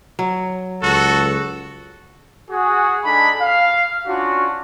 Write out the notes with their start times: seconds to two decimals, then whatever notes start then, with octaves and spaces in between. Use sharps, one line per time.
0.19 F#3
0.83 C#2 F#4 A4
2.51 F#4 G#4
3.05 G#3 D4 D#4 A4 G#5 B5
3.41 F5
4.08 C#4 D4 F4 F#4